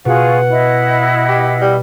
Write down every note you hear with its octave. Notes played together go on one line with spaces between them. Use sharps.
B2 F4 F#4 G#4 F#5
E4 D#5
G4
G3